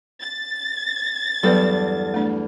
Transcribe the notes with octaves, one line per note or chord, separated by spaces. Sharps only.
A6
E2 G2 F#3 B3 A4 B4
A3 D4